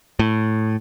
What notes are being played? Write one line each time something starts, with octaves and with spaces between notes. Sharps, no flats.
A2